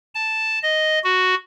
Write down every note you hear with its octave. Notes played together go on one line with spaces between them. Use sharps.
A5
D#5
F#4